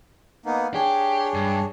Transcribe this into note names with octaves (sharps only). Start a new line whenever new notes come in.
A#3 B3 D#4
D4 G4 G#4 C#5
G2